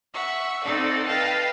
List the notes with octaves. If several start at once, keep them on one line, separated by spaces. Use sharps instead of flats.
E5 F#5 C#6
C4 D#4 A4 D5 F#5
B4 D#5 F5 G5 A5